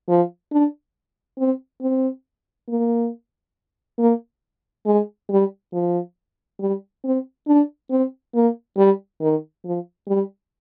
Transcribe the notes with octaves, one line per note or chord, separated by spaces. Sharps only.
F3
D4
C4
C4
A#3
A#3
G#3
G3
F3
G3
C4
D4
C4
A#3
G3
D#3
F3
G3